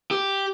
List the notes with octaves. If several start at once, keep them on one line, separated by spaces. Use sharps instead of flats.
G4